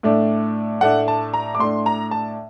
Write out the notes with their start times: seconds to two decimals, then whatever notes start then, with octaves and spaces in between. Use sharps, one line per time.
0.03 A2 A3 D4
0.81 A2 A3 D4 F#5
1.08 A5
1.34 A#5
1.55 D6
1.59 A2 A3 D4 C6
1.86 A#5
2.11 A5